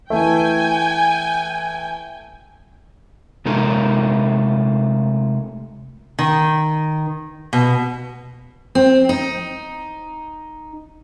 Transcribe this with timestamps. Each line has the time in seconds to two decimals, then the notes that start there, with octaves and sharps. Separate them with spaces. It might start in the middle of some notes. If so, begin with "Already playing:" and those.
0.10 E3 A3 G5 G#5
3.45 C3 G#3 A3 D#4 F4 A#4
6.19 D#3
7.53 B2
8.75 C4
9.09 D#4